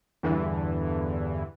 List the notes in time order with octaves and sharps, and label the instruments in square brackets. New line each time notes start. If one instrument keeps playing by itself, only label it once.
[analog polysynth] E2 G2 D3 E3